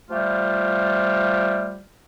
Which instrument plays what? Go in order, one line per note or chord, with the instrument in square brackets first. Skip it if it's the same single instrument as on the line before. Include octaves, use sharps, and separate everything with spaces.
[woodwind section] F3 G3 A3 F4 G4